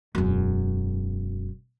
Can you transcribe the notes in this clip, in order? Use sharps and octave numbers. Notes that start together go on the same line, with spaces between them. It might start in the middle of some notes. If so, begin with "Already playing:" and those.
E1 F#2